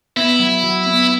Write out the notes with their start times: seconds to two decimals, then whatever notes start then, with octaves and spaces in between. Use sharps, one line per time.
0.16 B3 E4
0.40 F#3
0.63 F#3
0.86 B3